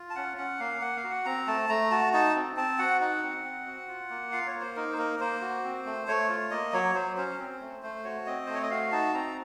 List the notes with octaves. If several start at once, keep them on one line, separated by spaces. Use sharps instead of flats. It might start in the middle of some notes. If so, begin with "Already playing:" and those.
Already playing: F4
A5
C#4 F#5
C#4 F#5
A#3 F5
A#3 F#5
F5
F#4
F#5
C4 A#5
A3 A5
A3 A#5
F#4 A5
D#4 A5
C4
C4 A5
F#4 F#5
D#4 F#5
C4
C4
F#4
F4
A#3
F4 F5
C#5
A#3
C5
D#4 A#4
C5
A#3 A#4
A#3 C5
F#4
C4
A3
A3 C#5
F4
A#3 D#5
F#3 C#5
F#3 C5
C#4 C5
C4
A3
A3 C5
F#4 C#5
C4 D#5
A3 C5
C#5
D#5
F#4 F5
D#4 A5
C4 A#5